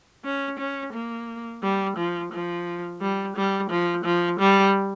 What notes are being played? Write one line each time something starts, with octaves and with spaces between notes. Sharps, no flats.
C#4
C#4
A#3
G3
F3
F3
G3
G3
F3
F3
G3